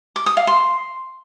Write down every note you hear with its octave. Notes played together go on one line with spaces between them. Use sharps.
D6
D#6
F5
C6